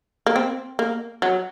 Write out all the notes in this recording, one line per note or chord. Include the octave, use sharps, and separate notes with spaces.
A#3
C4
A#3
F#3